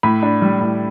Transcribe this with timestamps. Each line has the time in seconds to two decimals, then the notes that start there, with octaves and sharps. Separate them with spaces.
0.03 A2 B5
0.22 D4
0.42 G3
0.61 A2